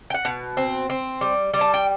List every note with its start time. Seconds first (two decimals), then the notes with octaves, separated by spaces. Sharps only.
0.10 G5
0.14 F#5
0.25 B2
0.57 C4
0.90 C4
1.21 G3
1.54 G3
1.61 A5
1.74 G5